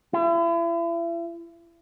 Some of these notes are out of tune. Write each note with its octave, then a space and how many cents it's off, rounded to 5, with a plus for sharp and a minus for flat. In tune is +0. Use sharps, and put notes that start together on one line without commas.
E4 +40